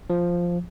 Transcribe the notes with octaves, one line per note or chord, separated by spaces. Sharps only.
F3